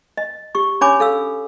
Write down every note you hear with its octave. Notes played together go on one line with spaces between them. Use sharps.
D#5
G4 C#6
C#4 D4 C#5 G#5 B5 D6
A4 F5 E6